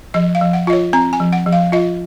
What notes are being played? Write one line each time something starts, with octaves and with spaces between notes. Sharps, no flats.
F3 D#5
F5
F3
F#5
F4 D#5
C#5
C4 A#5
G#5
F3
F#5
F3
F5
F4 D#5